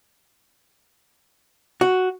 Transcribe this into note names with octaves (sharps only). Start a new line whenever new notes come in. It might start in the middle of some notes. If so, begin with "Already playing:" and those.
F#4